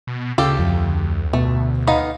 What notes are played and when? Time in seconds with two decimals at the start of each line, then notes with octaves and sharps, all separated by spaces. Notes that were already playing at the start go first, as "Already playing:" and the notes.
0.07 B2
0.38 D2 C#3 G4 A4 F5
0.59 F2
1.33 B2 A3
1.87 B3 D#4 F5